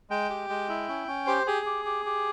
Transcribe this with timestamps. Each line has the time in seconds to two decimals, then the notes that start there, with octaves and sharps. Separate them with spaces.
0.10 G#3 G5
0.30 G4
0.50 G#3
0.69 E4
0.88 C#4
1.08 C#4
1.27 G4 C5
1.47 G4 G#4
1.66 G4
1.85 G4
2.06 G4